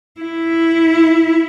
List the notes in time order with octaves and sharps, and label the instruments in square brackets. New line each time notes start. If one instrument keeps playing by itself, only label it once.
[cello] E4